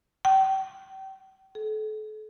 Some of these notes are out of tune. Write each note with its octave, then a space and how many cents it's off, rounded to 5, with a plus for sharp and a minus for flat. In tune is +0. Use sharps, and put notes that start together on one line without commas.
G5 -35
A4 -40